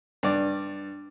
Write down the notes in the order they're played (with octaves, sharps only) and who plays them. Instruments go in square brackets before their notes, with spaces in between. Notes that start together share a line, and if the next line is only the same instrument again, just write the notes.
[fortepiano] G2 D5